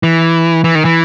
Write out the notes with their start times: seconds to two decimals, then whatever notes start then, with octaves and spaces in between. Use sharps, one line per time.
0.03 E3
0.64 E3
0.75 D#3
0.85 E3